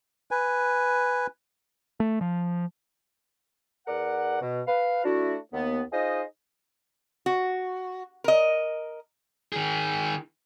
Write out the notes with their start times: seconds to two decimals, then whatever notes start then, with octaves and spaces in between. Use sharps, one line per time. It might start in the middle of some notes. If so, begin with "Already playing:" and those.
0.31 B4 G#5
2.00 A3
2.21 F3
3.87 E2 A#4 D5 F#5
4.41 B2
4.67 B4 F5
5.04 A3 D4 E4 F#4
5.52 D#2 B3
5.92 D#4 F4 G#4 C5 D#5
7.26 F#4
8.24 A#4 D#5
9.53 D#3 G#4